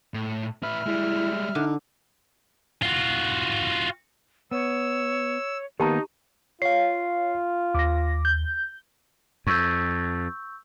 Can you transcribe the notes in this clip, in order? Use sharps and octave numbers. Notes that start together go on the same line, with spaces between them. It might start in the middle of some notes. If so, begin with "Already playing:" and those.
A2
A2 B4 E5 F6
G3 G#3 E4
D3 D#4
F4 F#4
B3 C#5 E6
D#3 A#3 B3 D#4 G4 A5 A#5
F4 C#5 F5 C7
D#2 D6 A#6
G6
F2 C#6 E6 G6